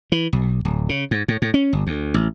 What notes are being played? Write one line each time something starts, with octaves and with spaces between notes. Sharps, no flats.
E3
B1
D1
C#3
G#2
A2
A2
C#4
G1
D2
A1